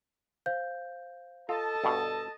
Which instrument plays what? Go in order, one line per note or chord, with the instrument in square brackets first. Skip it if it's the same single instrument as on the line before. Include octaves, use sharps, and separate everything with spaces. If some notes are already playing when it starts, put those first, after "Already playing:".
[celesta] C5 F5 G6
[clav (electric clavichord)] F4 [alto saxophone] A4 [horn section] D#5 A5
[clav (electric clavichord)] G2 B2